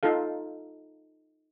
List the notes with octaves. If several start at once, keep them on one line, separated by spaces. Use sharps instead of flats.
D#4 F4 A4 F5